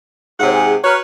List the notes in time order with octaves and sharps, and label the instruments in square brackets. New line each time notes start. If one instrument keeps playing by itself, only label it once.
[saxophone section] G#2 C3 F#5 [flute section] C5 C#5
[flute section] G#4 G#5
[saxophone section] F#4 B4 C#5 [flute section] A#5 F6 F#6